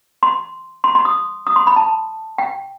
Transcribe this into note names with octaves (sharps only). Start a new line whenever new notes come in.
C6
C6
C6
D#6
D#6
C6
B5
A5
G5